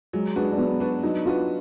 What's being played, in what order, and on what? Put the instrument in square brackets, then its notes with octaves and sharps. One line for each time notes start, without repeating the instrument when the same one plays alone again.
[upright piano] F#3 [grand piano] G#3
[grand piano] G#3 [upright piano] D4 F#4 B4
[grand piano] D4
[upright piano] F#3 [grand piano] B3
[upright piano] D4 F#4 B4
[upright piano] F#3 [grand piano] D#4
[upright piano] D4 F#4 B4 [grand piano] F4